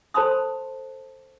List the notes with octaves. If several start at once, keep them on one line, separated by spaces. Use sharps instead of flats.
A4 C5 A5 B5 C6 D#6